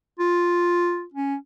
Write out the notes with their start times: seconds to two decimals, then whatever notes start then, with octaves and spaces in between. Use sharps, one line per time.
0.19 F4
1.14 C#4